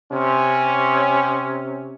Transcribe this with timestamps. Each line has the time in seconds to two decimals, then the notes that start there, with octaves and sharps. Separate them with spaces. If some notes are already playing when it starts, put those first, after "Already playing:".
0.12 C3 C#4